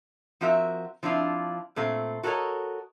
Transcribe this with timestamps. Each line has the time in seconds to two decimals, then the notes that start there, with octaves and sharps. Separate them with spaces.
0.41 F3 C4 F#4 A#4 E5
1.03 F3 C4 D4 E4 F4
1.76 A#2 A3 C4
2.23 F#4 A4 A#4 C5 C#5 D#5